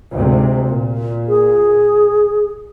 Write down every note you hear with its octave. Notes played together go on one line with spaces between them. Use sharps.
D2 G#2 C3
A#2
G#4